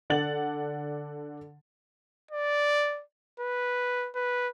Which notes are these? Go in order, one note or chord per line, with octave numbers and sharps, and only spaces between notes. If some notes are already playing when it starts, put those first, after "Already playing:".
D3 D4 F#5 A6 F#7
D5
B4
B4